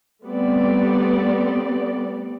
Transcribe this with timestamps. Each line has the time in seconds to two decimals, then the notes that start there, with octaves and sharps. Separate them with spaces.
0.26 G3 A3 B3 C4 D5